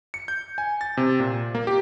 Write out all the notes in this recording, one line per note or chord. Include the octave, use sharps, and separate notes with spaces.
C#7
G6
G#5
A6
C3
A#2
A#3
G4